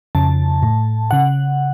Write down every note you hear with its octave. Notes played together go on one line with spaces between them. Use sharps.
F2 C#3 A5
A2
C#3 F#5